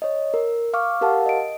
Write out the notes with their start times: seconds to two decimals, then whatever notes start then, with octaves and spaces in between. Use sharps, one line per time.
0.02 C#5 D#5
0.34 A#4
0.73 F5 C#6 D6 F6
1.01 G4 A#4 F5 F#5 A5
1.26 D#5 D7